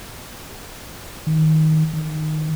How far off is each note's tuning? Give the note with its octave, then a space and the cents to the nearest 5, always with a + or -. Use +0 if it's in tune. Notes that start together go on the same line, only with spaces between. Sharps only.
D#3 +15
D#3 -10